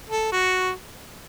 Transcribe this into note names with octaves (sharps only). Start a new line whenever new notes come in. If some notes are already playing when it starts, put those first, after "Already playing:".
A4
F#4